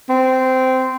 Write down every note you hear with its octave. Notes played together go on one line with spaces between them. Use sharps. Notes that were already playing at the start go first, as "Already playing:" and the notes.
C4